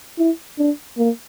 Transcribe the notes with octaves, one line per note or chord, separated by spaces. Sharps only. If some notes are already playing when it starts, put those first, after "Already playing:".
E4
D4
A#3